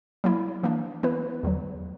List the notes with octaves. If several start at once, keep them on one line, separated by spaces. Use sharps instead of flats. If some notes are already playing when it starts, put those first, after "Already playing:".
F#3 A#3 E4
E3 A#3 D4
E3 B3 E4 B4
E2 D3 F#3